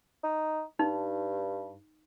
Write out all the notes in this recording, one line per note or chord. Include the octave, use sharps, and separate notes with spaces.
D#4
G2 D#4